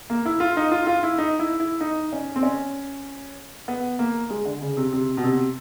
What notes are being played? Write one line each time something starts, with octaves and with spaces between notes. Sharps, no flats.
A#3
E4
F4
D#4
F4
F4
E4
D#4
E4
E4
D#4
C#4
C4
C#4
B3
A#3
G#3
D3
C#3
C3
C3
B2
C3